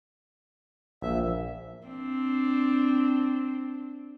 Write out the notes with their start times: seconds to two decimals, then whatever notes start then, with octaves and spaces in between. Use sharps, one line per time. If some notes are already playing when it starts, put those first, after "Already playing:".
1.02 A#1 E5
1.87 C4 D4